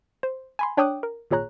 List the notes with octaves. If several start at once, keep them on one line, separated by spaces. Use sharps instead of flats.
C5
G#5 B5 C6
D4 C#5 G5 D6 D#6 F#6
A#4
G#1 A#2 G#4 C#5 A#5 F#6